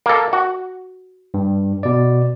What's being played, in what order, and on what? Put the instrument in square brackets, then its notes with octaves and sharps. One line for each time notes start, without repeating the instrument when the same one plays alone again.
[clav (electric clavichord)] A#3 A4
F#4
[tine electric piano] G2
B2 D5